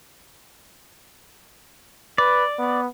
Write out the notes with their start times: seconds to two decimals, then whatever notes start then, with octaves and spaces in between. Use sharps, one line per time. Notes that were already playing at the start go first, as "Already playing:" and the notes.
2.18 B4 D5
2.59 B3